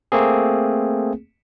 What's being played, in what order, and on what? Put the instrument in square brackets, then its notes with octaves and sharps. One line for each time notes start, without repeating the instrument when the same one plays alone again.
[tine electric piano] A3 A#3 C4 G#4